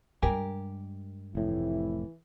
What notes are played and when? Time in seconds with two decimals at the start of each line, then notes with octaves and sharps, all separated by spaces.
0.23 G2 G#3 G4 A#4 G#5
1.35 F1 A2 C3 E3 E4